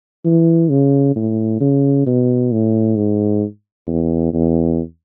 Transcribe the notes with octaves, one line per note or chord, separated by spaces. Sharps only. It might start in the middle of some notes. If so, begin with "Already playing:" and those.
E3
C#3
A2
C#3
B2
A2
G#2
E2
E2